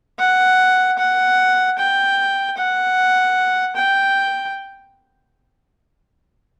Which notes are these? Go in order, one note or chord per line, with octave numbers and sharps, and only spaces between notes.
F#5
F#5
G5
F#5
G5